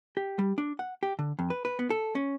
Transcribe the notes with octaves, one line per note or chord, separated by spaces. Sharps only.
G4
G3
D4
F#5
G4
D3
F2
B4
B4
B3
A4
C#4